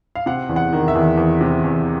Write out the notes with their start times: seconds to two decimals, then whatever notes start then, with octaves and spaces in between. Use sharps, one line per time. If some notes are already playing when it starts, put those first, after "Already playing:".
0.15 F5
0.26 C3 F#5
0.49 E2
0.56 F#5
0.73 D#3
0.88 E5
0.95 E2
1.17 E2
1.41 C3
1.64 E2